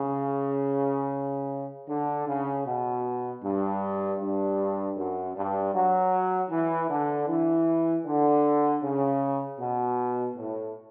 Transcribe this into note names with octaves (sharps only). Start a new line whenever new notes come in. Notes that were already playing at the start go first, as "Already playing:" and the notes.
Already playing: C#3
D3
C#3
B2
G2
G2
F#2
G2
F#3
E3
D3
E3
D3
C#3
B2
A2